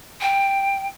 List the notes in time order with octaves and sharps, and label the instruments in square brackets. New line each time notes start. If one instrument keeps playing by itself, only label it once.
[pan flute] G5